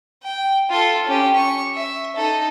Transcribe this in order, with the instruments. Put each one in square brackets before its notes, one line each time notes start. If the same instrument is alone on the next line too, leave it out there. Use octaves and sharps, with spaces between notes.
[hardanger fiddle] G5
F4 A4
C#4 G4
C#6
E5
D#4 A4